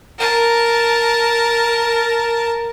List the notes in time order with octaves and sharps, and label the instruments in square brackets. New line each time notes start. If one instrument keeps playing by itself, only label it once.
[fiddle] A#4 A5